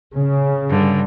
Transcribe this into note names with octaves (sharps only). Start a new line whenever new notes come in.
C#3
G2 D3